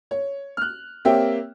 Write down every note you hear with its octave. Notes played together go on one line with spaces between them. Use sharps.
C#5
F6 F#6
A#3 C4 G4 C#5 E5 G5